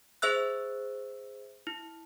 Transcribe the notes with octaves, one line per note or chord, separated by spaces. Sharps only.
G#4 C5 E5 E6 F#6
E4